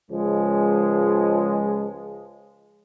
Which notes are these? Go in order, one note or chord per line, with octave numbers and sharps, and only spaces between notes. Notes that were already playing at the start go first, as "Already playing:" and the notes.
C#2 F3 G#3